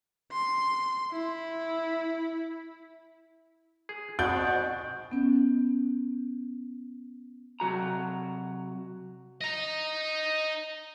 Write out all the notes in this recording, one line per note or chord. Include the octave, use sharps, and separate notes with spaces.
C6
E4
G#4
F2 G#2 B2 B3 F#4 D5 G6
B3 C#4
C3 F#3 F#4 A#5
D#5 A#5